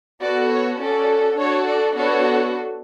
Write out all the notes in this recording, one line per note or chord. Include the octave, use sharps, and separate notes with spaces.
B3 F#4 A4 D5
C#5
C#4 F#4 A4 D5
D4 F#4 A4 C#5
D5
B3 D4 F#4 A4 C#5